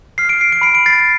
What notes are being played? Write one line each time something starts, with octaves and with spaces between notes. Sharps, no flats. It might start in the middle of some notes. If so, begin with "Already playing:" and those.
F6 C7
D7
C7
D7
B5 C7
D7
A6 C7